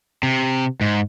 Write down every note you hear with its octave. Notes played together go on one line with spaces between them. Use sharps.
C3
G#2